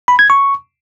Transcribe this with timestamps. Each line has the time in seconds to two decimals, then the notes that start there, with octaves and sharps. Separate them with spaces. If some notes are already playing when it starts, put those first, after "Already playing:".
0.08 B5
0.19 G#6
0.30 C#6